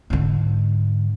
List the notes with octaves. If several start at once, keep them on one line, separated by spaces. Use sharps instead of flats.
G#2 D3